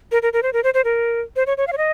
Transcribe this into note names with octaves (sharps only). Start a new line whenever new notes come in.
A#4
A#4
A#4
C5
A#4
C5
C5
A#4
C5
C#5
C#5
F5
C#5
D#5